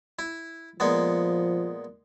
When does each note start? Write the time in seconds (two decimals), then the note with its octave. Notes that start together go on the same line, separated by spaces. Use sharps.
0.19 E4
0.80 A#2 F3 G#3 B3